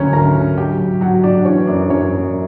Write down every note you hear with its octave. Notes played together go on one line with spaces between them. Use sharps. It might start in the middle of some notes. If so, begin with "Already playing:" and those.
Already playing: D2 D3 F#3 A#3 C#4 A#4 C#5
D3 A#4 A#5
D3
F#3 G4 G5
F#3
F#3 F#4 F#5
F#3 D4 D5
E3 C#4 C#5
F#2 D4 D5
F#2 C#4 C#5
F#2